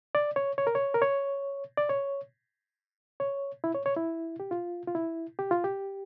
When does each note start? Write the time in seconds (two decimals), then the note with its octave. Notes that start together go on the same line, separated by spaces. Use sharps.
0.15 D5
0.36 C#5
0.58 C#5
0.67 A#4
0.75 C#5
0.94 A#4
1.02 C#5
1.77 D5
1.89 C#5
3.20 C#5
3.64 E4
3.75 C#5
3.86 C#5
3.97 E4
4.40 G4
4.51 F4
4.87 F4
4.95 E4
5.39 G4
5.51 F4
5.64 G4